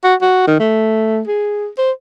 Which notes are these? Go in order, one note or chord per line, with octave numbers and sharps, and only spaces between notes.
F#4
F#4
D#3
A3
G#4
C5